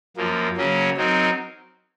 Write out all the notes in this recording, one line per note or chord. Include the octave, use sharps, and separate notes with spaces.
F#2 F3 A#3
C#3 F#3 A#3 C#4
F#3 C4 D#4 A#4